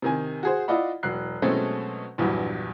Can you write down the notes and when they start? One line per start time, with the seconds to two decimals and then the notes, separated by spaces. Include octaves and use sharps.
0.02 C3 D#3 G#5
0.43 F#4 G#4 C5
0.68 E4 F4 D5 D#5 F#5 B5
1.03 E1 F#3 F#6 C7
1.42 B2 F#3 G#3 A3 C4 C#4
2.18 A#1 E2 G2 F#3